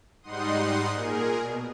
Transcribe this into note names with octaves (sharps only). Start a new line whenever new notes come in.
G#2 G3 D#4 F#5 C6 D#6
A#2 G#4 A#4
B2